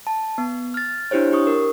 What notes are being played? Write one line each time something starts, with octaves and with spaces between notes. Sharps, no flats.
A5
B3
F6 A6
D4 E4 G4 C5 C#5
G4 C#6 D#6
A#4